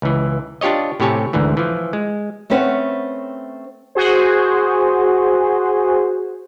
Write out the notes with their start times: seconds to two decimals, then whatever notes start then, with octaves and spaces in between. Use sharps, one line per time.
0.02 C#2 E3
0.61 D4 F4 G4 C#5 D#5
1.00 A2 C3 G4 C#5 G#5 A5
1.33 D2 G#2 D3 E3
1.57 E3 F3
1.93 G#3
2.50 A3 C4 C#4 B4 C5 F#5
3.95 F#4 G#4 C5